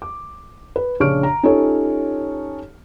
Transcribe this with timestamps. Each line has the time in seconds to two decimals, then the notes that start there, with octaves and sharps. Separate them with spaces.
0.02 D6
0.76 B4
1.00 A#1 C#3 D4 C#6 F6 D7
1.23 A#5
1.43 C#4 D#4 F4 G4 A4 C#5